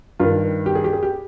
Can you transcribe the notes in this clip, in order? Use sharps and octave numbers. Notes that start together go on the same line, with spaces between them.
G2 D#3 F4
G4
G#4
G4
G#4
G4